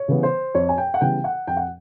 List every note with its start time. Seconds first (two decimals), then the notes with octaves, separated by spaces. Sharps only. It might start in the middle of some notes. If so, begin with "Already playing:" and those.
Already playing: C#5
0.08 C#3 E3 G3 B3
0.23 C5
0.54 F2 C#5
0.69 G#5
0.78 G5
0.94 F#5
1.01 C#3 E3 G3 B3 G5
1.24 F#5
1.47 F2 G5
1.57 F#5